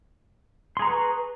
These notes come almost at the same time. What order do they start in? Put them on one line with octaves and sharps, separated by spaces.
C6 G#4 A#5 C#6 B4